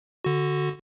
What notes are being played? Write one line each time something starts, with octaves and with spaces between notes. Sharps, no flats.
D3 F#4